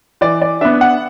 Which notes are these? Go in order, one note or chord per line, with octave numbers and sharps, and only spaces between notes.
E3 D5
D5
B3 D4 E5
F#5